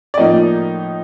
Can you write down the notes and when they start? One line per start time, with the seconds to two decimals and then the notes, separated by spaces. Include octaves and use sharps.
0.14 D5
0.18 A2 F3 A#3 D#4 D#5